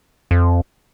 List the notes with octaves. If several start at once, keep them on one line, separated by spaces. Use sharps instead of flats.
F2